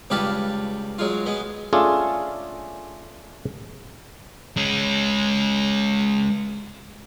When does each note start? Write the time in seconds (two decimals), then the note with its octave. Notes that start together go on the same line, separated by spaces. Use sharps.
0.10 C#2 G2 G4 B4 F5 A5
0.99 F#3 G#3 F4
1.26 G#3 B3
1.73 A3 C#4 D4 F4 G#4 A4
4.57 G#3 C#4